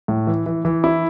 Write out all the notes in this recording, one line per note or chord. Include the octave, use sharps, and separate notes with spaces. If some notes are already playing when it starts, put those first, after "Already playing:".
A2
E3
E3
E3
E4